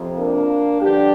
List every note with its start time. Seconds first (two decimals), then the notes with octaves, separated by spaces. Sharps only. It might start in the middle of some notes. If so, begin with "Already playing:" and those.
Already playing: F2 C3 F3
0.17 A#3 D4
0.81 G2 D3 F3 D4 G4